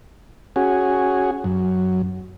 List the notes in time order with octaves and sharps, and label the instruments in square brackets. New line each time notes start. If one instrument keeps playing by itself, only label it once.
[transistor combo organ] C#4 F#4 G#4
F#2